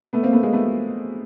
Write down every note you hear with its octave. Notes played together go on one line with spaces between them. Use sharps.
A3 B3
A#3 C4
A3 B3
G#3 A#3
A3 B3